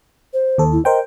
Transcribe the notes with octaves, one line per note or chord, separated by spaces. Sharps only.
C5
D#2 A4
E4
A#4 C5 D#5 G5